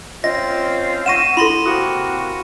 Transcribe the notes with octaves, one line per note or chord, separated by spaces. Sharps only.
C4 C#4 F4 D#5 A#6
F#5 C#6 A#6 D#7 E7
E4 A4 B5 C6 A#6
C3 A#3 F#4 D#6